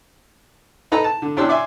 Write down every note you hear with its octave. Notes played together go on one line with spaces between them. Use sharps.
D#4 A4 B4 A#5
A5
D3
E2 C#4 D4 G4 C6 E6
D5 E5 G#5 C6